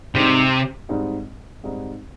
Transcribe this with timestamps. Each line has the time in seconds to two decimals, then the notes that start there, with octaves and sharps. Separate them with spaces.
0.14 G#2 C3 G3 C4 D#4
0.89 G#2 G3 C4 D#4
1.64 G#2 G3 C4 D#4